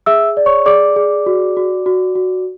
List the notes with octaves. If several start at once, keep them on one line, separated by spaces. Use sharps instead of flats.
G#4 E5 E6
D5
C#5 C#6
G#4 D5 D6
G#4
F#4
F#4
F#4
F#4